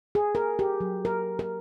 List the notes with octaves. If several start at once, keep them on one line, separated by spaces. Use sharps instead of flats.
G#4
A#4
G4
F#3
A#4
A#4